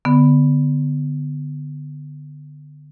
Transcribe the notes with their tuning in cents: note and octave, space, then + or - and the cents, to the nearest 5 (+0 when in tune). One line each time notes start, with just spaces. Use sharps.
D3 +5 B3 +0